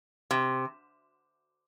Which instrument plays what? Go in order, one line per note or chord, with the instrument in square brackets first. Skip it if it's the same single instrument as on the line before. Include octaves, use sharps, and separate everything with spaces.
[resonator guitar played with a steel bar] C3